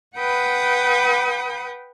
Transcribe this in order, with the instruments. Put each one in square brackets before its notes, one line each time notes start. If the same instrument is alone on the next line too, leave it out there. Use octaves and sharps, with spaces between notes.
[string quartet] B4 F#5 G5 B5 D#6